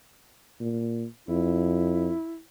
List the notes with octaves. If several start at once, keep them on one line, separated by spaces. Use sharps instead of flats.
A#2
F2 E4